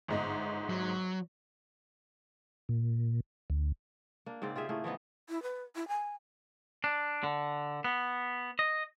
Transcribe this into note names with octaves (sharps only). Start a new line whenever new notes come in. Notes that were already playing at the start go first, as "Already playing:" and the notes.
G1 G#2 D#5
F#3
A#2
D2
A#3 D4
G#2 C#3 C4 D5
F4 G4 G#4 E5
A2 A3 A#3 G#4
E3 F3 B3 D#4
E4
B4
E4
G#5
D4
D3
B3
D#5